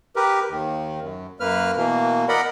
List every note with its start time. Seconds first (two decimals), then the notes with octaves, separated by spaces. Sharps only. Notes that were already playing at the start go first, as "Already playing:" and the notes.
0.16 G4 A#4 B4
0.50 D#2 D#3
1.02 F#2
1.40 F#2 A#3 B4 F6
1.77 B2 E3 A#3
2.29 A#4 D5 D#5 F#5 B5